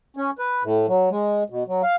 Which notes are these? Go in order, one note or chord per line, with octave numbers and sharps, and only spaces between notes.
C#4
B4
A2
F#3
G#3
B2
F#3
F5